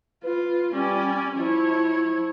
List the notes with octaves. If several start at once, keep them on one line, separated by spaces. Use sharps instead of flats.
F4 B4
G3 C#4 D5
F3 E4 C#5